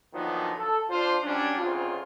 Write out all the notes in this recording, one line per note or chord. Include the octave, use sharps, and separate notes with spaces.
A#2 D3 D#3 F3 F#3 B3
A4
D4 F4 C5
F#3 G3 C#4 D4
D2 C#3 C4 F4